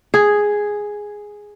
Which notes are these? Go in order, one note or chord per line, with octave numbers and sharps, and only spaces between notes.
G#4